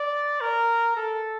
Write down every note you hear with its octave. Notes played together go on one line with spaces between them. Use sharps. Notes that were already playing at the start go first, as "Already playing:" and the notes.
Already playing: D5
A#4
A4